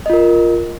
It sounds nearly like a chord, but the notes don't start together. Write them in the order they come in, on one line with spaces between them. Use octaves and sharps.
D#5 F4 A#4